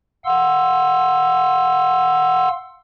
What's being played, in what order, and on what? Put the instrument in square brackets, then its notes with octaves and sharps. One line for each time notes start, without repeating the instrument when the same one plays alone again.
[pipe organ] F5 F#5 C6 E6